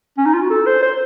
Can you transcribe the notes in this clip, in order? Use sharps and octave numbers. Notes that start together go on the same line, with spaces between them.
C#4
D#4
F4
F#4
A4
C5
C5